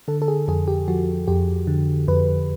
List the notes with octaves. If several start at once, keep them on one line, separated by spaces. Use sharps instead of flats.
D3 A4
A4
G#4
F2 G#4
G4
F3 F#4
F2 G4
D3
F2 B4